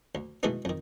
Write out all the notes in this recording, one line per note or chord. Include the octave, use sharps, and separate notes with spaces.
D2
B2 E3 G#3 A3 B3 D#4
F2 D#3